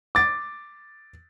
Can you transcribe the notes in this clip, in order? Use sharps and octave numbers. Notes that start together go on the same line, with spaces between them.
D6 A6